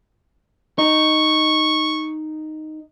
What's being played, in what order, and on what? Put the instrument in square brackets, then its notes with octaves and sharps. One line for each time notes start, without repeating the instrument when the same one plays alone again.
[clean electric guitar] D#4 [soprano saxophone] C#6